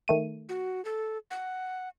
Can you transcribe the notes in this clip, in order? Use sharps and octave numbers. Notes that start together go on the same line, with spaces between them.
D#3 A3 D#7
F#4
A4
F#5